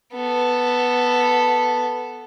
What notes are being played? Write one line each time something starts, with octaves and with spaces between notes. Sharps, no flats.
B3 A4